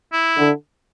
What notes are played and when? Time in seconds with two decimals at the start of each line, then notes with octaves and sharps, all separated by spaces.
0.13 E4
0.36 D3